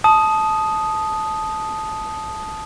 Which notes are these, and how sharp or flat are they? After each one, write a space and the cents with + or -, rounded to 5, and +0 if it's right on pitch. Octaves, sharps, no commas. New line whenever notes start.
A5 -15 D#6 +0